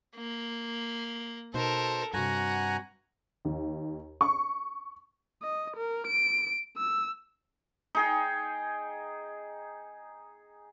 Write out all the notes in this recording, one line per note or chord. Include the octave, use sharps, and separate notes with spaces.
A#3
B2 D#4 A4 A#4 C5
G2 C3 F#4 F#5 G#5 A#5
D#2
C#6
D#5
A#4
D7
E6
D#4 G#4 G5